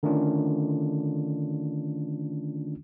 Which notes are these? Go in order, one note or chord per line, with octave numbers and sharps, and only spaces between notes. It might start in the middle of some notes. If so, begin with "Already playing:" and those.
D3 D#3 A3 C#4 D4 F4